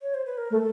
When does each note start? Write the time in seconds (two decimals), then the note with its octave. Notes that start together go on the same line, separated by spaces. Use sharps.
0.02 C#5
0.14 C5
0.26 B4
0.38 A#4
0.50 A3 A#4
0.55 A4